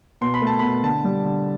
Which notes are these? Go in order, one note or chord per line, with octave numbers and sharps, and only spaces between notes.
B2 C6
B5
A3
A5
B2 B5
D3 A5
G3
D3